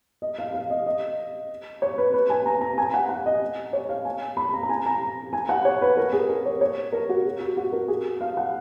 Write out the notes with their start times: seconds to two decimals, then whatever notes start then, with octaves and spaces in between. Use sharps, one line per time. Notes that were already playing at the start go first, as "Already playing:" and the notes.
0.22 D#5
0.39 F5
0.54 F5
0.70 D#5
0.87 D#5
1.82 C#5
1.98 B4
2.14 B4
2.30 G#5
2.46 A#5
2.61 A#5
2.78 G#5
2.94 F#5
3.09 F#5
3.26 D#5
3.73 C#5
3.89 F5
4.05 G#5
4.37 B5
4.53 A#5
4.63 A#5
4.69 G#5
4.86 A#5
5.33 G#5
5.49 F#5
5.65 C#5
5.82 B4
5.97 A#4
6.13 G#4
6.29 A#4
6.45 C#5
6.61 C#5
6.92 A#4
7.09 F#4
7.25 G#4
7.41 F#4
7.57 F#4
7.73 A#4
7.88 G#4
8.21 F5
8.37 F#5